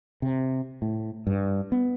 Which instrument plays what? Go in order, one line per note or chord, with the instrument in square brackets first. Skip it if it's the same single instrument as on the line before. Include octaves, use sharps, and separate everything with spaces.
[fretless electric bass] C3
A2
G2
B3